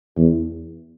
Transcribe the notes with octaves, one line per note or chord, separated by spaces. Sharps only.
E2